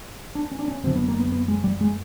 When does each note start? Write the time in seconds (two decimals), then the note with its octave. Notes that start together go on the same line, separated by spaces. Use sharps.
0.35 D4
0.52 C#4
0.59 D4
0.68 C#4
0.83 F#1 F#2 D3 C4
0.95 B3
1.08 A#3
1.20 B3
1.32 B3
1.48 G#3
1.64 G3
1.81 G#3